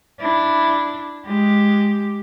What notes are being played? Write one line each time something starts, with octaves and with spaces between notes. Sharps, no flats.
D4 E4
G#3 G4